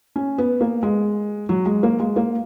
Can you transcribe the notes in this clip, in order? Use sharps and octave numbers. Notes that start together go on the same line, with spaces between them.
C#4
B3
A#3
G#3
F#3
G#3
A#3
G#3
A#3